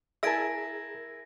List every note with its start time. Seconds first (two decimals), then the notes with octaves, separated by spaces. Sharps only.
0.23 E4 G#4 A#4 G#5 A5 E6 A#6 D7